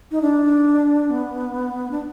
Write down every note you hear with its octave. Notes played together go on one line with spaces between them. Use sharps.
D#4
D4
B3
D4